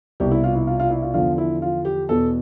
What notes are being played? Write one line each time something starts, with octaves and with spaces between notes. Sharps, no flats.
C2 B2 G4
E4
F4
E4
F4
F4
E4
F4
E2 D3 F3 F4
E4
F4
G4
E2 B2 A4